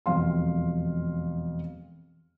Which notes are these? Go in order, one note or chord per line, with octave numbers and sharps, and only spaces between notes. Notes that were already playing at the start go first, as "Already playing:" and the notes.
E1 F2 F5 C6